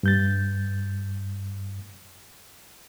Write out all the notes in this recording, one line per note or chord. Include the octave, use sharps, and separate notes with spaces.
G2 G6 A6